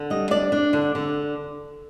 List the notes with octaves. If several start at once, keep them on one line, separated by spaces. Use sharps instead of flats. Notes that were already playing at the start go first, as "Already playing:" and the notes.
Already playing: D3
G3 D#5
D4 D5
D4
D3
D3